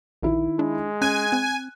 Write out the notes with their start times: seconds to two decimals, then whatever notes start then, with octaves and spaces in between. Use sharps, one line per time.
0.22 A#1 D#3 E4
0.59 G#3 D4
1.02 C#4 G#5 F#6
1.32 C4